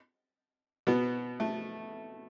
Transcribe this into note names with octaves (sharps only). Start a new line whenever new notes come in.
B2 B3
A3